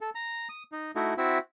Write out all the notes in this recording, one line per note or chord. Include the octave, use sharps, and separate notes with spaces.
A4
A#5
D#6
D#4
A3 D#4 E4 F#4
C4 E4 F#4 E5